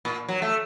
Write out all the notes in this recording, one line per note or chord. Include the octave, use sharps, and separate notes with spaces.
A#2
F#3
A3